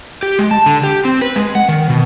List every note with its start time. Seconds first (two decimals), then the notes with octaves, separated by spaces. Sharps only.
0.23 G4
0.39 G#3
0.51 A5
0.66 D3
0.83 G4
1.05 C4
1.21 B4
1.36 G#3
1.55 F#5
1.69 D#3
1.89 B2